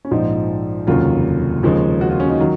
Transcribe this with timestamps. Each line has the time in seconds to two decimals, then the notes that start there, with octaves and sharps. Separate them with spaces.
0.05 C#4
0.11 A#1 G#2 F3 D#4
0.87 F1 D#2 C#3 F#3 F4
1.63 D#2 C#3 F3 G#3
2.01 F#4
2.10 F4
2.20 C#4
2.29 D#4
2.39 D#3 F#3 F4